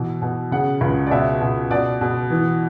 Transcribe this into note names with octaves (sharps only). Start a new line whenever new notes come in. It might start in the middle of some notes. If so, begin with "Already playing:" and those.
Already playing: B2 E3
B2
C#3 F#5
C#2
D5
B2 E5
B2
B2 D5
B2
E3